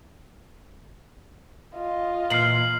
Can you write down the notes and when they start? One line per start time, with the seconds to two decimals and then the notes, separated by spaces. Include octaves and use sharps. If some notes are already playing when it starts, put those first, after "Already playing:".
1.74 F4 D#5
2.30 A#2 E3 F6 C7 F#7